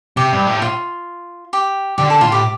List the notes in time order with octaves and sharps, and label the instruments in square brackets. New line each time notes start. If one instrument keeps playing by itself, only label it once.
[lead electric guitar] C3 [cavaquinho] G4
[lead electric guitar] G2
A2
[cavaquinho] F4
G4
[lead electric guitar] D3 [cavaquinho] G4
[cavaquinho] A4
[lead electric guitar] A2 [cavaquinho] F4
[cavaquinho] G4